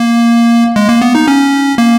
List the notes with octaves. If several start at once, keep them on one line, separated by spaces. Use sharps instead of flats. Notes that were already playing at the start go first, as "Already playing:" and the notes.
Already playing: A#3
G#3
A#3
B3
D#4
C#4
A#3